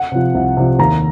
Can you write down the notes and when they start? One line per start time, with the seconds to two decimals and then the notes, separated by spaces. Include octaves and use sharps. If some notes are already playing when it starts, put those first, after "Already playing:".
Already playing: F#5
0.12 C3 F3
0.35 C2
0.57 C3 F3
0.79 D#2 A#5